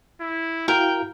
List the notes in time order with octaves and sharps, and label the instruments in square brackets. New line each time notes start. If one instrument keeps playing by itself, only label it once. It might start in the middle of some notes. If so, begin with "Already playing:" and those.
[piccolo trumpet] E4
[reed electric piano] E4 F#4 F5 [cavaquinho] A#4 [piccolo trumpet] G5